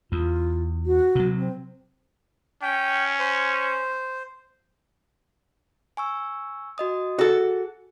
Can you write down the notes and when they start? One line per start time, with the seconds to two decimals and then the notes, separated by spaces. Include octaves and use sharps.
0.12 E2 F4
0.86 F#4
1.15 C3 F#3
1.36 C4
2.62 C#4 G5
3.19 C5
5.97 G#5 C#6 E6
6.78 F#4 D#5 D#6
7.19 F#4 G#4 A4